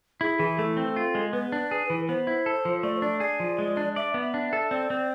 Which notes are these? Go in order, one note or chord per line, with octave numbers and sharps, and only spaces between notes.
E4 G#4
E3 G#4
A3 A4
C4
F4
G#3
B3 B4
D4
G#4
E3
B3 C5
E4
A4
F3
A3 D5
C5
D4 D5
G#4 D5
F3
G#3
D4
D5 E5
B3
E5
D4
A4
C4 D5
C4